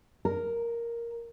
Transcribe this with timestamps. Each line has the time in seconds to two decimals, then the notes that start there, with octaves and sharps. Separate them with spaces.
0.25 A#4